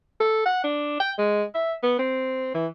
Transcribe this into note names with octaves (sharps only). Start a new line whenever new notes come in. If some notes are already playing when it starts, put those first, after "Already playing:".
A4
F#5
D4
G5
G#3
E5
B3
C4
E3